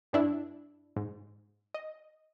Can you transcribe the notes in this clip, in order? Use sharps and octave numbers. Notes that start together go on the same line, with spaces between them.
G2 D4 E4
G#2
D#5